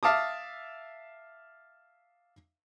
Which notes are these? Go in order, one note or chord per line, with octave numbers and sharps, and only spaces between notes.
E5 F5 A5 D6 D#6